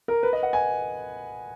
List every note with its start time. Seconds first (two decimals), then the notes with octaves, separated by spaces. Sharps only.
0.08 A#4
0.23 B4
0.33 D#5
0.43 F#5
0.53 G#5